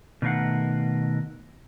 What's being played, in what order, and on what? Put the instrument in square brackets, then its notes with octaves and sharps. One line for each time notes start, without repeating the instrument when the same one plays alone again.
[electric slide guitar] B2 D#3 A3 A#4 F5 F#5